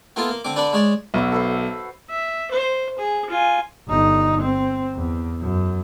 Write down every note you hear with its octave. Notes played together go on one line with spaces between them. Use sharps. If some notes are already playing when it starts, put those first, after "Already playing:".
A#3 B3 E4 F4 A4
A#3
D3 C4 D6
D3 D4 B4 D5
G#3 C#5 D5
B1 F#4 B4 E5
A4 B4 C5
E5
C5
G#4
F4 G#5
G1 D#4
C4
E2
F#2